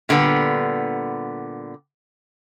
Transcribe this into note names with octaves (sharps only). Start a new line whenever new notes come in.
A#2 D3 G3 B3